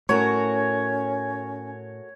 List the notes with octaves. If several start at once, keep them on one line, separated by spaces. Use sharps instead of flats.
A2 A3 C#4 F#4 A#4 C#5